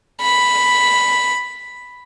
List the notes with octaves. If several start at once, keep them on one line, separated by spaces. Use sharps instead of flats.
B5